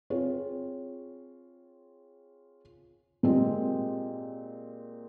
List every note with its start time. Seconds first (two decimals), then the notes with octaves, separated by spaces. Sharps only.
0.10 C4 F4 G#4 C#5
3.23 A#2 G#3 C4 G4